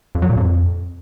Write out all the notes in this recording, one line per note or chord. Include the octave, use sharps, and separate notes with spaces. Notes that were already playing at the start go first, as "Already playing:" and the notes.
F2
F#3
A#2
F2